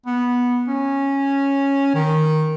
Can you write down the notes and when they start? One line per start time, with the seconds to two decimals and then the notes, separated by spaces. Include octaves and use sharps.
0.06 B3
0.68 C#4
1.95 D#3